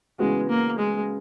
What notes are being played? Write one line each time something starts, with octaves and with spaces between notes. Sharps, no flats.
C#3 E3 G#3 B3 F#4
A#3
G#3